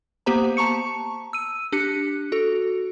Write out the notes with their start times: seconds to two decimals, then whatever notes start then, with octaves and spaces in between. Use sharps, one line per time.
0.26 A#3 B3 G4 C5 A#5
0.57 A5 A#5 C#6 C#7
1.33 E6 D#7
1.72 D4 G4 F#6 C#7
2.32 F#4 A4